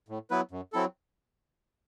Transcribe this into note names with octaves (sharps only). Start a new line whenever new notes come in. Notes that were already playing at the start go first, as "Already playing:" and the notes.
A2
F#3 B3 E4 B4
F#2
F#3 C4 E4 A4